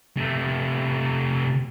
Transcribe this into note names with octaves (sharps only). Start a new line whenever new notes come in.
C3 A3